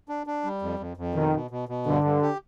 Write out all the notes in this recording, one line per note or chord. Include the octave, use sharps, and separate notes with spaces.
D4
D4
G3
F2
F2
F2
B2 D#3
B2
B2
B2
G2 D3
G2
G4